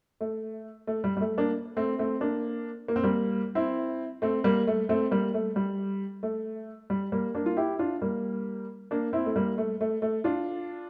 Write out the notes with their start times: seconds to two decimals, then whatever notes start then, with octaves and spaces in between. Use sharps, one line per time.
0.21 A3
0.87 A3
1.04 G3
1.17 G3
1.21 A3
1.38 A#3 D4
1.77 A3 C4
1.99 A3 C4
2.21 A#3 D4
2.88 A#3
2.96 C4
3.04 G3 A#3
3.55 C4 E4
4.22 A3 C4
4.44 G3 A#3
4.67 A3
4.89 A3 C4
5.11 G3 A#3
5.34 A3
5.56 G3
6.23 A3
6.90 G3
7.12 G3 A#3
7.35 A#3 D4
7.46 F4
7.57 E4 G4
7.79 D4 F4
8.02 G3 A#3
8.91 A#3 D4
9.13 C4 E4
9.26 A3
9.36 G3 A#3
9.58 A3
9.81 A3
10.02 A3
10.24 D4 F4